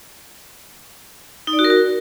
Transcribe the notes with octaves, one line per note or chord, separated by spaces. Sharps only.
D#4
D5
F#4
A#4
F#4